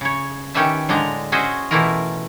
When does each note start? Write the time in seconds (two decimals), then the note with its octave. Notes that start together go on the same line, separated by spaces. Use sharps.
0.01 C#3 C#5
0.54 D#3 C#4 G4 B4 E5 A5
0.89 A2 D3 G#3 D4 A#5
1.32 C#4 F#4 G#4 C5 D#5 E5
1.71 B2 E3 A3 E4 F4 A#4